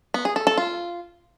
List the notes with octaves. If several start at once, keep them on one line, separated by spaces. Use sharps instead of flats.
B3
G#4
A4
A4
F4